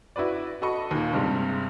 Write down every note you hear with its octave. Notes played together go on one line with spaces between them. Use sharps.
E4 F#4 B4 D5
F#4 A4 D#5 B5 C#6
D#2 A#2
G2 C3 G3 G#3